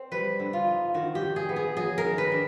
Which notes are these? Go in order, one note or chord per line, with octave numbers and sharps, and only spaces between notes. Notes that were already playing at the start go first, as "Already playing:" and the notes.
Already playing: C4
G3 B4
D3
F4
D#4
D#3 F#4
G4
D4
G#4
B3
G#4
F#3 G#4
A#4
D#3
B4
D4